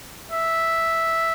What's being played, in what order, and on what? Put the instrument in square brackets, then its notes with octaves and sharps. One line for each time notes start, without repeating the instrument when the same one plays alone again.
[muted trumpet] E5